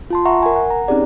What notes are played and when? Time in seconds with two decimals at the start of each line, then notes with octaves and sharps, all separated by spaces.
0.10 F4 A5 C6
0.25 E5 F#5 A#5 C#6
0.43 A#4 G#5
0.56 F#5
0.70 A#5
0.88 C4 C#4 D#4 G4 G#4 D5